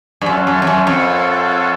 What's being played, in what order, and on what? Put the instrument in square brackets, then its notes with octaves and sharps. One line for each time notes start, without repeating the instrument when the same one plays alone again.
[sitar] G2
[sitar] F#2 [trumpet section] F4 A4 C#5 F#5
[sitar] F#2
F2
F#2
F2